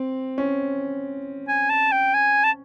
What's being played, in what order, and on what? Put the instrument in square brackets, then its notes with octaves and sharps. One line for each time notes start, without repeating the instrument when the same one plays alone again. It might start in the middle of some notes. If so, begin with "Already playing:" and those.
Already playing: [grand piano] C4
C#4
[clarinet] G#5
A5
G5
G#5
A5